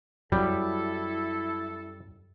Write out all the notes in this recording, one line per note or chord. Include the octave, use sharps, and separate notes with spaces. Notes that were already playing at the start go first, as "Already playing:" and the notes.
F#2 F#3 G3 E4 A4